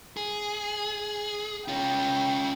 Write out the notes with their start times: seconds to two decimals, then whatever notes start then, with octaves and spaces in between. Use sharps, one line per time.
0.17 G#4
1.68 C#4 F4 G5